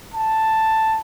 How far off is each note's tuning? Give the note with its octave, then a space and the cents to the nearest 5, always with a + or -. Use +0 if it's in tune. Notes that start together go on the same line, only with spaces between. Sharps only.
A5 +5